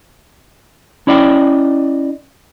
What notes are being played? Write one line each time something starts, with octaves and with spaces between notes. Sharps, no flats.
C#4 E4 D5 D#5 G5